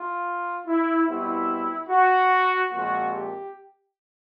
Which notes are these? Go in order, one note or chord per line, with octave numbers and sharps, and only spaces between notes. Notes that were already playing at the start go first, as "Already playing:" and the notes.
Already playing: F4
E4
B2 G3 C4 E4
F#4
A#2 F3 G#3 C4 F#4
G4